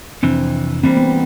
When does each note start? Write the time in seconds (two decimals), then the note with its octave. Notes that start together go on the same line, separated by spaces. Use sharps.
0.23 F2 C3 E3 C4 D4
0.84 E3 G3 A#3 C4
0.97 B3